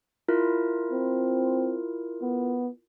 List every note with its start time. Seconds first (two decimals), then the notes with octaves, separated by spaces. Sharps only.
0.28 E4 F4 A#4
0.92 C4
2.22 B3